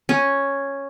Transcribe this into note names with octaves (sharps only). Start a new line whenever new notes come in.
C#4